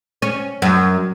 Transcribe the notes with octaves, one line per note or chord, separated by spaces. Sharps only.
C#4
F#2